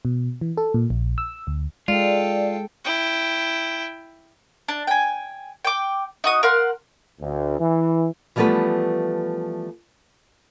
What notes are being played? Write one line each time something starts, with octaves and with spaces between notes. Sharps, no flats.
B2
E3
A4
A#2
A#1
E6
D2
G#3 F4 A4 D5 G5
E4 G5
D4
G5 G#5
G5 D6
D#4 F#4 D#6
A#4 F5 F#5 C6
D2
E3
E3 F3 G3 A3 B3 B4